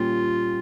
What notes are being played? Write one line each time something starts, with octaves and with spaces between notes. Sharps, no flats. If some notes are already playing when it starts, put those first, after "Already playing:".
Already playing: A#2 G3 C#4 F4 G4